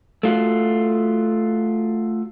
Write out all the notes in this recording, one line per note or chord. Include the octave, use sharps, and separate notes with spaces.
A3 F4 F#4